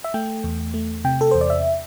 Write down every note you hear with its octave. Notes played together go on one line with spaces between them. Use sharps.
E5
A3 G5
E2
A3
C3 G5
A4
E2 C5
D5
E5